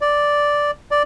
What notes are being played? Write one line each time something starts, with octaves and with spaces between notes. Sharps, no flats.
D5
D5